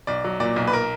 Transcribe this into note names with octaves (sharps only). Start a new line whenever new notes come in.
B1 D5
F#3
A#2 D5
B1
B4
A#4